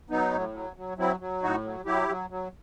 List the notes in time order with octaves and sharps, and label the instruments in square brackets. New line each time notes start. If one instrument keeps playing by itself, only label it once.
[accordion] F#3 B3 D#4
A2
F#3
F#3
F#3 C4 E4
F#3
A2 D#4 F#4
F#3
F#3 E4 G4
F#3
F#3